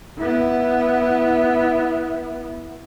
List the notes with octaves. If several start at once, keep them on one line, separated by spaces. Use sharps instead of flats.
B3 E4